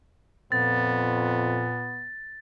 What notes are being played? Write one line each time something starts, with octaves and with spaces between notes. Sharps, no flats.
F2 A#2 B3 A6